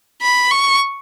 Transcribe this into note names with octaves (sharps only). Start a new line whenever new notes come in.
B5
C#6